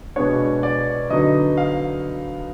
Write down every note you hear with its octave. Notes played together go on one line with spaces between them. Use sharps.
B2 G#3 B3 D4 C#5
D5
D3 F#3 B3 D#4 D#5
F5